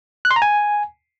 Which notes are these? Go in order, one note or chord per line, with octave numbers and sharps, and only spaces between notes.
F#6
C6
A#5
G#5